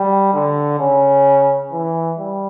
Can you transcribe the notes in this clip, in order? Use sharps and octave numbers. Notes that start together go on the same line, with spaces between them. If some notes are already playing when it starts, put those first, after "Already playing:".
Already playing: G3
D3
C#3
E3
G3